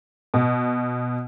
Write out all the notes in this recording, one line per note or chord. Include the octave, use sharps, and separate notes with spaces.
B2